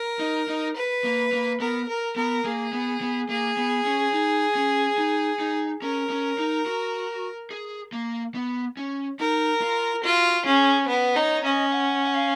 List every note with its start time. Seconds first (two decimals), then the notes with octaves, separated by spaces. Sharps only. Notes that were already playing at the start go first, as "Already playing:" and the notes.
Already playing: A#4
0.19 D#4
0.48 D#4
0.76 B4
1.04 A#3
1.33 A#3
1.60 B3 A#4
1.88 A#4
2.16 B3 A#4
2.44 A#3 G#4
2.73 B3
3.01 B3
3.29 A#3 G#4
3.57 B3
3.85 C#4
4.13 D#4
4.55 C#4
4.98 D#4
5.39 D#4
5.82 C#4 A#4
6.10 C#4
6.38 D#4
6.66 F#4
7.51 G#4
7.92 A#3
8.35 B3
8.77 C#4
9.19 D#4 A#4
9.61 F4
10.04 F4 F#4
10.45 C#4 G#4
10.88 B3 B4
11.16 D#4 C#5
11.34 C#5
11.44 C#4 D#5
11.72 F#5
12.05 F#5
12.14 F5